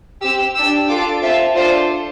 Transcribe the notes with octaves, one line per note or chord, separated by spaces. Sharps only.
C4 G4 E6
D4 G4 E6
D4 F4 A4 D6
C4 F4 A4 E5
D4 F4 A4 C5